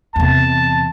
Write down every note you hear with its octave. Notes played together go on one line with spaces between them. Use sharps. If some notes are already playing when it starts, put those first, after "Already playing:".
E2 C3 A5